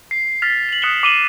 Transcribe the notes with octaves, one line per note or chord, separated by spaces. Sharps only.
C7
F6 A6 B6 F7
F7 F#7
D#6 F#6 C#7 E7 F7 G7
D6 C7 D#7 E7 F#7 G7